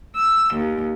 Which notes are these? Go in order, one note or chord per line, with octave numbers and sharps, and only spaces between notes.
E6
D#2